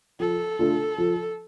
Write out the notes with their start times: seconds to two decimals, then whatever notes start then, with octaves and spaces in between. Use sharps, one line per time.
0.19 F3 A4
0.59 A3 D4 F4
0.98 F3